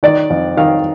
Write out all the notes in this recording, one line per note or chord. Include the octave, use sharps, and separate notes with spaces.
D#3 D5
F2
D#3 F5